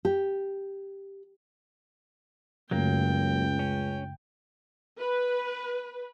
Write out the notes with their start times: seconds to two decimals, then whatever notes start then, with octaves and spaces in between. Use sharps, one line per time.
0.05 G4
2.71 C#2 F#2 C#3 F#3 A3 A#3 G5
3.59 C#4
4.99 B4